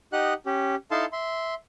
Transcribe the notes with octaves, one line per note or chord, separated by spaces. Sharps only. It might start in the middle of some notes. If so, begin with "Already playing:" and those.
D#4 G4 D#5 F#5 F#6
C#4 G4
D#4 E4 A4 F5 A5 C6
E5 C6